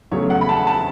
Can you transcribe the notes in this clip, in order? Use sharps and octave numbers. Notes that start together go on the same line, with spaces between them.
E2 C#3 F#3 A3 C#5
F#5
B5
A5
A5